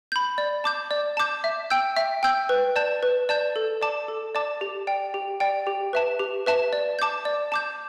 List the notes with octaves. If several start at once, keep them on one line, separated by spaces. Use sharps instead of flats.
B5 G6
D5
A5 D6 G6
D5
A5 D6 G6
E5
G5 E6 G6
E5
G5 E6 G6
B4
D5 A5 G6
B4
D5 A5 G6
A4
D5 A5 D6
A4
D5 A5 D6
G4
D5 G5
G4
D5 G5
G4
B4 E5 A5
G4
B4 E5 A5
D5
A5 D6 G6
D5
A5 D6 G6